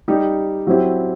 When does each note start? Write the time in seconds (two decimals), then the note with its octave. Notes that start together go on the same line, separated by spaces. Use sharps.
0.08 G3 D#4 G4
0.67 F#3 C4 E4 G4